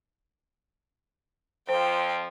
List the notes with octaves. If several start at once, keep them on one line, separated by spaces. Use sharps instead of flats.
F2 F3 C5 G5